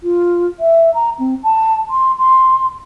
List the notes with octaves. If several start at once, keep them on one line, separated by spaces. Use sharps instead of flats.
F4
E5
A#5
C4
A5
C6
C6